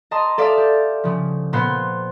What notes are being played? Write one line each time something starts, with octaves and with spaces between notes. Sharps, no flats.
D#5 A5 A#5 C6
A4 D5 E5 F5
G4
C#3 F3
A#2 B3 C5